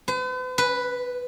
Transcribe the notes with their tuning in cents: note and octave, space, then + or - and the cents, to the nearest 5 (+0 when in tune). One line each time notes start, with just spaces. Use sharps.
B4 +45
B4 +0